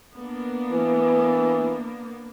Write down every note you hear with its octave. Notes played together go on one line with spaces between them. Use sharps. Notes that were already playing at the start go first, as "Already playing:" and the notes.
A#3 B3 D4
E3